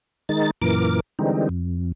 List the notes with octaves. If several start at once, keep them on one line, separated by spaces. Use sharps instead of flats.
D#3 G#3 D#4 A6
F#2 A#2 E3 A#4 D6
D3 E3 G3 G#3 C4 D#4
F2